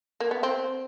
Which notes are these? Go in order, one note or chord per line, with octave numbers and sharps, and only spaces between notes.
A#3
B3
C4